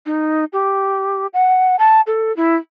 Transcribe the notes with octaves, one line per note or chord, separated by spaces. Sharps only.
D#4
G4
F#5
A5
A4
E4